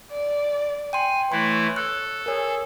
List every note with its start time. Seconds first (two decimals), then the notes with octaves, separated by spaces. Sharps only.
0.11 D5
0.93 G5 G#5 C6
1.32 E3 A3 E4 C#5 C6
1.76 A4 F#6
2.26 G#4 A#4 C#5